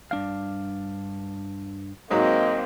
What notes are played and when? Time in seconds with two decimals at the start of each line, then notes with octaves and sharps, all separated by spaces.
0.11 G2 D4 F5
2.11 G#2 F#3 A#3 C4 D#5